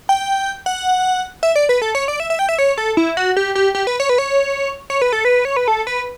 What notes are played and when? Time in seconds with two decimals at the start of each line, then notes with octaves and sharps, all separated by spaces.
0.09 G5
0.66 F#5
1.43 E5
1.56 D5
1.69 B4
1.82 A4
1.95 C#5
2.08 D5
2.20 E5
2.30 E5
2.39 G5
2.49 E5
2.58 C#5
2.78 A4
2.97 E4
3.17 F#4
3.37 G4
3.55 G4
3.75 G4
3.87 B4
4.00 C#5
4.09 B4
4.18 C#5
4.90 C#5
5.02 B4
5.13 A4
5.25 B4
5.45 C#5
5.57 B4
5.68 A4
5.87 B4